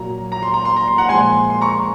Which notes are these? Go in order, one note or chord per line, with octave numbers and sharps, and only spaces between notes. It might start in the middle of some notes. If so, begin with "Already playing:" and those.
Already playing: A#2 F#3 A#3 A#5
A#5
C6
A#5
C6
A#5
C6
F#5 A#5
A#2 F3 G#3 G#5 C6
C6
A#5 C#6